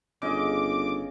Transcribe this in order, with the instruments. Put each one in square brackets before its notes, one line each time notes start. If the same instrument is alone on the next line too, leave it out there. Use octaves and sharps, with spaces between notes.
[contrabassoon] G1 [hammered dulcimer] C#3 D#5 [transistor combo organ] D6